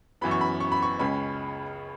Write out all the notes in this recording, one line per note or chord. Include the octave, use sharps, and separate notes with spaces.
F#2 E3 B3 B5
C#6
B5
C#6
B5
C#6
C#2 C#3 G#3 C#4 B5